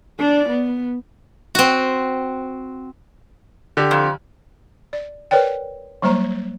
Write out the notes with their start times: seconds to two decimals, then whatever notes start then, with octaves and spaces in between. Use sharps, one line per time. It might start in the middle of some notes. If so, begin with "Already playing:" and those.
0.19 D4 D5
0.50 B3
1.55 C4 F#4
3.77 D3 G4
3.91 F2
4.93 D5
5.31 A#4 B4 C#5 D5 G5
6.02 F#3 G3 A#3 C5 A#5